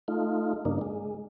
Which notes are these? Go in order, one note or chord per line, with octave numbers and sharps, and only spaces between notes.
A3 D#4 F4
G2 C#3 A#3 D4 D#4
G#3